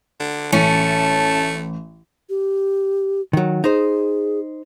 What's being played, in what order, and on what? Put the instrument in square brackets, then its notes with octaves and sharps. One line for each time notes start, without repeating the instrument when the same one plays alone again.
[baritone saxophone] D3
[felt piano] A1 [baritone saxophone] A3 [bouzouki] C#4 [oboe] A5
[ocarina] G4
[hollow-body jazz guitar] D#3 F#3
[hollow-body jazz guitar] D#4 C5 [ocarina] G#4